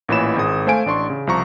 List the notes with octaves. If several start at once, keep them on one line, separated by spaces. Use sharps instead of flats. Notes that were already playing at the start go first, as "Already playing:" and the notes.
A1 A#2 E3 C#5 B5 E7
G#1 G#3 D#6
A3 C5 F5 G#5 D7
A1 D4 C6 C#6
C#3
C2 F3 A#5 C#6